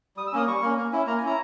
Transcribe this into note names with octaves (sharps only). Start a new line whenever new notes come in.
G3 D#6
E6
A#3 C#4 D#6
G3 C#6
A#3 C#4
A#3
C#4 E4
A#3 A#5
G#5
C#4 E4 A#5